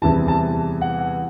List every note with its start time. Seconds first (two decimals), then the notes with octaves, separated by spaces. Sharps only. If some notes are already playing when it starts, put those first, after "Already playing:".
0.02 E2 C3 E3 G3 A5
0.28 A5
0.81 F#5